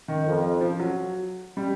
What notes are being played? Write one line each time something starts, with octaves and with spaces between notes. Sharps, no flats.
D#3
F2
F3
F#3
G3